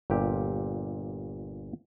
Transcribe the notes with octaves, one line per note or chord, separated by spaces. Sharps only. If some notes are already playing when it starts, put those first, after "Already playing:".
G1 A#2 G4